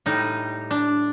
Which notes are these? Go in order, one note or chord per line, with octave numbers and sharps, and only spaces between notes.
A2 G3 D#4
D4